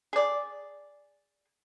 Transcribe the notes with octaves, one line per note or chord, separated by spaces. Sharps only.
G#4 D5